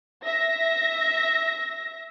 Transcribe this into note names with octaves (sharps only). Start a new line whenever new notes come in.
E5 A#6